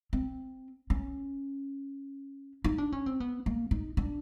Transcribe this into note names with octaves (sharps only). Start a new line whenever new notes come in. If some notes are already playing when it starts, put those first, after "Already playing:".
C4
C#4
D#4
D4
C#4
C4
B3
A#3
D#4
D4